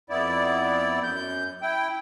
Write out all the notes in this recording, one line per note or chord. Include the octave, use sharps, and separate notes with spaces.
F2 B3 E4 D5
F#2 G6
E4 G5